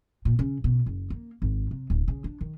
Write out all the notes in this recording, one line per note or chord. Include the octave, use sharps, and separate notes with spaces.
A#2
C#3
B2
F#1
A#3
G#1
C3
D1
C#3
D4
D#3